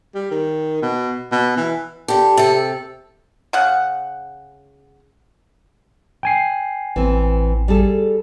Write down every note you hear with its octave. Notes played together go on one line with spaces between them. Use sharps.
G3
D#3
B2
B2
E3
D3 G4 A5
C3 A4
C#3 F#5
G5 G#5 C7
A1 E3 C4
G3 G#4 A4